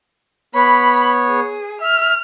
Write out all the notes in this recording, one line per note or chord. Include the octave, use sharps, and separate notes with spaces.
B3 C#5 B5
G#4
E5 F6